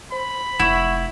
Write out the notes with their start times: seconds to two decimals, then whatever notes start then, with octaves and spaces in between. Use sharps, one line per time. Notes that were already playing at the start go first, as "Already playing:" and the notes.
0.12 C5 B5
0.60 F1 E4 F#5 C#6